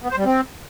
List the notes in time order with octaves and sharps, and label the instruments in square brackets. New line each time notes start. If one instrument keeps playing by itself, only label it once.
[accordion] B3
C5
G3
C4